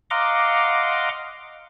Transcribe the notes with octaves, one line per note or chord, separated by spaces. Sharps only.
D#5 F5 F#5 A#5 C6 D6